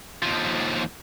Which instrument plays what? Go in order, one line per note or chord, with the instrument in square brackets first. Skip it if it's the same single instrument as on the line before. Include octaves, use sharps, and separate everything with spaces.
[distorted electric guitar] D#2 F3